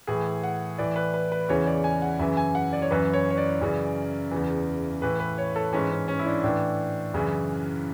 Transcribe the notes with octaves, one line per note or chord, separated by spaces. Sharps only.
A2 E3 G#4
F#5
A2 E3 D5
B4
B4
B4
E2 C#3 E3 C#5
D5
G#5
F#5
F#2 C#3 E3 E5
G#5
F#5
D5
C#5
F#2 E3 B4
C#5
C#5
D5
F#2 C#3 E3
E2 C#3 E3
A2 E3 B4
B4
C#5
A4
G#2 E3 C#4
C#4
C#4
E4
D4
A2 E3 D4
F#2 C#3 E3